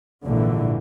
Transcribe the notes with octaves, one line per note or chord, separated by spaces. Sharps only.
A#1 G#2 D3 E3